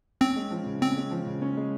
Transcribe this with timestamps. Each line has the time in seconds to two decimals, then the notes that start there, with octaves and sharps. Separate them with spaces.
0.21 C4 C#4
0.36 G#3
0.51 F3
0.66 C#3
0.81 C4 C#4
0.97 G#3
1.11 F3
1.27 C#3
1.42 C#4
1.57 G#3